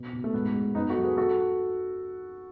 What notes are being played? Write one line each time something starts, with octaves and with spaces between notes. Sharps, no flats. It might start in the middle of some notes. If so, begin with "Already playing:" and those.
Already playing: B2
B2
A3
G#2 B3
G#3
F#2 B3 D#4
F#4 A4
F#3
G#4 B4
F#4 A4